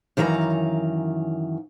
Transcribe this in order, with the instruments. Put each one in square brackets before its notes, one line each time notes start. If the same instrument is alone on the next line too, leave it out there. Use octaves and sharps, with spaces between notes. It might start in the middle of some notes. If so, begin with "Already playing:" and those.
[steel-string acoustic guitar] F#2 D#3 E3 F5 A#5